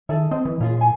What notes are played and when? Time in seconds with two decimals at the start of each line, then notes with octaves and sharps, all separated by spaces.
0.09 D#3 G#4 A4 E5
0.31 C4 D#5
0.45 E3
0.60 A#2 C#4 F4 G#4
0.78 F4 G#5